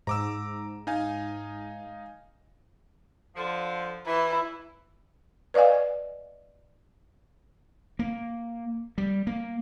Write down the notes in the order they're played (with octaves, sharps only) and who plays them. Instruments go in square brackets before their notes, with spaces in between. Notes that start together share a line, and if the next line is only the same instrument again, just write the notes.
[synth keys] G#2 [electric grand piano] A#5 D6 E6
[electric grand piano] D#4 F5 G#5
[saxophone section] D3 F3
[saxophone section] E3 [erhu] E4
[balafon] B4 D5 D#5 F5 G#5
[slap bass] A#3
G3
A#3